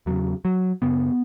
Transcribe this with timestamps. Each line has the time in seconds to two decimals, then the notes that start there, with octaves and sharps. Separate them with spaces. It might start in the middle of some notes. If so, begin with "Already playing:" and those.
0.06 E2 C#3 F#3
0.45 F#3
0.82 F#2 C#3 B3